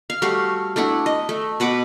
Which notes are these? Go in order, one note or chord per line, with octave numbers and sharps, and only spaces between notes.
F5
G3 A3 F#4 F5
A3 D4 E4 F#5
D#5
A3
B2 B4 F#5 D6